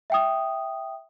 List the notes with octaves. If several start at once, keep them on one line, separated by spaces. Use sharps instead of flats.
E5 G5 D#6